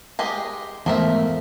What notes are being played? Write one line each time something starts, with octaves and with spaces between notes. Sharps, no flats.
G#3 G4 D#5
E2 G#2 F3 A3 A#4 E5